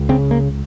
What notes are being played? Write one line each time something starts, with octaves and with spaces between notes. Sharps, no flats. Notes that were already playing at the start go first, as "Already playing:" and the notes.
Already playing: C#2
C#3 C4
A#3